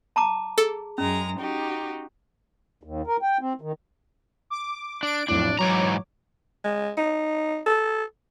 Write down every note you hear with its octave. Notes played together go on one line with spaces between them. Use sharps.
A5 A#5 D6
G#4 A4
F#2 G#3 C#4 A#5
D#4 F#4 G4
D#2
A#4
G5
C4
D#3
D6
D4 D7
B1 F2 A2 D4
G#2 E3 F#3 C#5 A#5 D6
G#3
D#4
A4